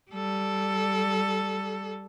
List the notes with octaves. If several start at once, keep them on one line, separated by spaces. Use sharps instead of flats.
G3 A4